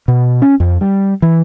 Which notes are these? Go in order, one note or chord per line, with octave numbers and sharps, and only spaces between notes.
B2
C#4
F2
G3
E3